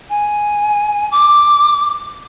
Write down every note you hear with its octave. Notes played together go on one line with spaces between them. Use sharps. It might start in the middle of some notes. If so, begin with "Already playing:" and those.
G#5
D6